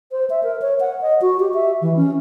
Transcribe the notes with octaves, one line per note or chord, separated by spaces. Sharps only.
C5
E5
A#4
C#5
F#5
D#5
F#4
G4
E5
E3
C#4